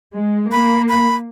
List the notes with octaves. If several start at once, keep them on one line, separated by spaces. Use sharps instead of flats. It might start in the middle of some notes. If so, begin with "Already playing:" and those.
G#3
A#3 B5
B5